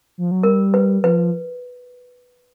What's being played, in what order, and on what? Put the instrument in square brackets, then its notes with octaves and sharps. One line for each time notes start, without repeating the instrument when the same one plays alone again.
[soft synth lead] F3
F#3
[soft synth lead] G3 [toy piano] A#4
[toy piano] B4
[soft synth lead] F3 [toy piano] B4